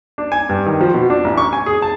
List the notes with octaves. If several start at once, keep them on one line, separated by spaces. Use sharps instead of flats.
D4
G#5
G2
D#3
F3
B2
D4
A1
C#6
G#5
G#4
A5